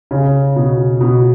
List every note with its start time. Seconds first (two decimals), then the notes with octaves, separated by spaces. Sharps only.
0.11 C#3
0.56 B2
1.01 B2